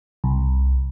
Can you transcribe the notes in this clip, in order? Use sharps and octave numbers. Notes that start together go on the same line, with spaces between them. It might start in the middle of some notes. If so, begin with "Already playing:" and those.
C2